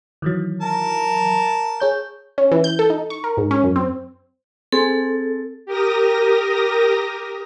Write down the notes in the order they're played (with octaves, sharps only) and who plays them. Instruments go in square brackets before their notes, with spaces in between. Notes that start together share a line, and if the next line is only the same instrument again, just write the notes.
[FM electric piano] D#3 E3 F#3
[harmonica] A#4 A5
[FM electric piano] G#4 C#5 G6
[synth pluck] C#4
E3
G6
A4
D#4
C#6
A#4
G#2
C#4
F#2
C4
[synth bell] C4 G#4 [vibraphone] A4
[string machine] G4 A#4 D#6 A#6